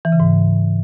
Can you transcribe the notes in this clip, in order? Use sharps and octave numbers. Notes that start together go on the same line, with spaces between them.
E3
C#3
G#2